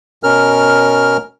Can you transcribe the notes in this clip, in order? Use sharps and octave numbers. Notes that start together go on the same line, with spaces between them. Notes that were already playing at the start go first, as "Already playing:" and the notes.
B2 C#4 A#4 F6